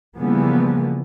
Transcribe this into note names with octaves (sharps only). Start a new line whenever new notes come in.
C#3 E3 F3 G3 A#3 B3